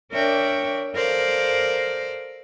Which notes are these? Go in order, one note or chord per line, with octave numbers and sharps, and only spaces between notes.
D4 A#4 C#5 D5 E5 G5
A4 A#4 C5 D5 F5